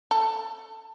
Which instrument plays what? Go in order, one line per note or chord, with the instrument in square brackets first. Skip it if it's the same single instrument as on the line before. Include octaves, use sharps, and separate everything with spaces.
[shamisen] A4